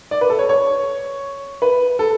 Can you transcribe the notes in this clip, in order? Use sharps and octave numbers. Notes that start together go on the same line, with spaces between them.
D5
B4
A4
C#5
C#5
B4
A4